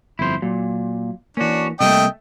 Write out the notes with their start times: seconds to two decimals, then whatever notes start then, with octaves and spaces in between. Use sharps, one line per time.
0.19 G1 F2 E4 C5
0.42 A#2 F#3
1.37 E3 A#3 C#4 D4 F#4
1.80 C3 G3 A3 A#3 D#5 G5